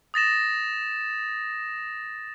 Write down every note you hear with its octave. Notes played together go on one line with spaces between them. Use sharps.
D#6 A6 A#6 E7